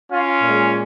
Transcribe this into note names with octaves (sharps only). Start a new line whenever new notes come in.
C#4 F4
A#2 G#3